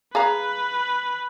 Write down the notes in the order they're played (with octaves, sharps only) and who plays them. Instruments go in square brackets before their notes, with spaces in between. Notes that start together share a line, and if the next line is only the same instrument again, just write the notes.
[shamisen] G#4 F5 A#5 [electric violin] B4